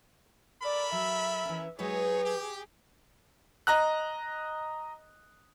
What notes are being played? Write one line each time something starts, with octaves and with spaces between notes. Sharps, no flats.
A4 A#4 D5 B5
F#3 E5
E3 C#4
F#3 G#3 D#4 G#4 B4 C#5
G4
D#5 A#5 F#6